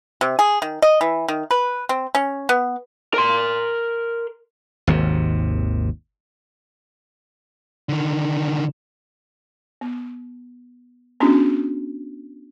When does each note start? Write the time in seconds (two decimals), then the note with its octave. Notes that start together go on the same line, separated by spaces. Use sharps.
0.21 C3
0.39 G#4
0.62 D#3
0.82 D#5
1.01 E3
1.28 D#3
1.51 B4
1.89 C4
2.15 C#4
2.49 B3
3.14 A#4 C6
4.87 G#1 D#2 C3
7.89 D3 D#3
9.81 B3
11.20 B3 C#4 D4 E4 F#4 G#4